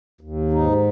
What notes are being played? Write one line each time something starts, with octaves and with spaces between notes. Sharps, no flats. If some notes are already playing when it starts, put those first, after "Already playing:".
D#2
G#2 D#4